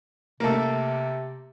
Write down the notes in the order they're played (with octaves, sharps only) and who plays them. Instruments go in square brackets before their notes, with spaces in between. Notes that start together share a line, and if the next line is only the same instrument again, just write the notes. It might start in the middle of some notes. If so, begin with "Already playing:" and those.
[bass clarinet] C3 [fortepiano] A3 A#3